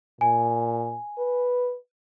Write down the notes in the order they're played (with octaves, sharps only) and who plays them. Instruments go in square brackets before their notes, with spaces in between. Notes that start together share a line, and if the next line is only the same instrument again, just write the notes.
[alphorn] A#2 [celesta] G#5
[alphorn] B4